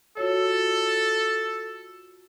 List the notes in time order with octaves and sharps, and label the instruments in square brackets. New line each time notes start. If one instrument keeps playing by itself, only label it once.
[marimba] F4 F#4 C#5 [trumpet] A4